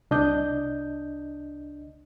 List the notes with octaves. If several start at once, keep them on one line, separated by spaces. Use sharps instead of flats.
C2 D4 D#5 G6